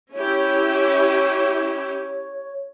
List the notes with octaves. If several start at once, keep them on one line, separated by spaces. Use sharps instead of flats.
C#4 E4 G4 C#5